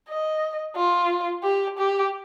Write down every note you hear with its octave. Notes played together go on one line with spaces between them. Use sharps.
D#5
F4
G4
G4